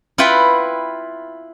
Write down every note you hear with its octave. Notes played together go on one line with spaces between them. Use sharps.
E4 F4 B4 F#5 G5